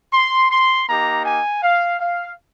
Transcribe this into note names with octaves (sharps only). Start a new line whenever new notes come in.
C6
C6
A#3 D#4 G4 A#5
G#5
F5
F5